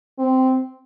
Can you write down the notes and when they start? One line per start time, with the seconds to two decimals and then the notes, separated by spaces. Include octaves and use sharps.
0.19 C4